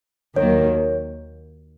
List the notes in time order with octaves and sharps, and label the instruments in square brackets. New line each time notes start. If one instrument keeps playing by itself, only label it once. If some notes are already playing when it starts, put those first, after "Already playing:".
[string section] D#2 D#3 F#3 A#3 [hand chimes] C#5